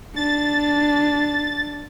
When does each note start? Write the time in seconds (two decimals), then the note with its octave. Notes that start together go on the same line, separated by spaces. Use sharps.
0.16 D4 A6